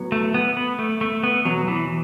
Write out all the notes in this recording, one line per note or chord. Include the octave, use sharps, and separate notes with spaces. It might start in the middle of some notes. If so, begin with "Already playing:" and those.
Already playing: A2 F#3 B3
A3
B3
B3
A3
A3
B3
E2 B2 F#3 B3
E3